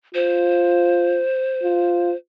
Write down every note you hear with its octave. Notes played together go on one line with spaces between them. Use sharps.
F4 C5
F4